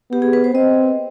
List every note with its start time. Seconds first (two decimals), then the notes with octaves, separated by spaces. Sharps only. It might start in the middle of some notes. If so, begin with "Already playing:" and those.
0.12 B3 G4
0.22 G#4
0.33 B4
0.44 C5
0.54 C4 D#5